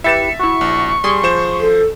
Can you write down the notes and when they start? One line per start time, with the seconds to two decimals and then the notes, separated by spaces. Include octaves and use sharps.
0.04 E4 G4 B4 E5 A6 C#7 E7
0.39 E4 F#4 C#6
0.61 A#1
1.04 G3 G#4 C6
1.23 F3 C5 E7
1.60 A4